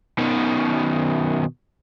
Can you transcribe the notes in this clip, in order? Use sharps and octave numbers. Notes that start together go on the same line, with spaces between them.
B2 D#3